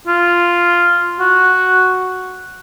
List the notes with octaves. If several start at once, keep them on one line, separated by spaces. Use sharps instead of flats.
F4
F#4